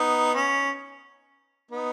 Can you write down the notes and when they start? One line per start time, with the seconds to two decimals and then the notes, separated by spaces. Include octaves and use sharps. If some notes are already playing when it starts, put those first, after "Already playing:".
Already playing: B3 D#4
0.34 C#4
1.71 B3 D#4